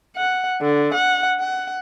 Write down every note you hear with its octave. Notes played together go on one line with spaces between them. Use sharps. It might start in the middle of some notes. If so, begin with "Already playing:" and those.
F#5
D3
F#5
F#5